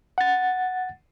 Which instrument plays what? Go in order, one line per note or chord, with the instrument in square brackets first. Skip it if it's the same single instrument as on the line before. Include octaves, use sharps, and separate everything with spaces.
[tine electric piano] F#5 A6